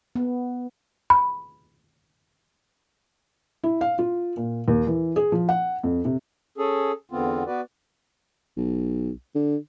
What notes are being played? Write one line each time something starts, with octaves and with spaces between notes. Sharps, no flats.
B3
B5
E4
F5
F4
A#2
D#2
E3
G#4
F3
F#5
F2
C3
C#4 G#4 A4
E2 D3 B3 C4 F4
B3 F#4 B4 D5
B1
D3